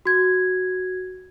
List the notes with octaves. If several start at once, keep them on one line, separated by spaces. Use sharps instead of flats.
F#4 G#6